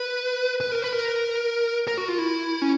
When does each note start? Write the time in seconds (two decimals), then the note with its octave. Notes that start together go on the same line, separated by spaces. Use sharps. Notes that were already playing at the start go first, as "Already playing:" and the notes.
Already playing: B4
0.61 B4
0.72 A#4
0.82 B4
0.93 A#4
1.87 A#4
1.98 F#4
2.08 F4
2.18 E4
2.62 C#4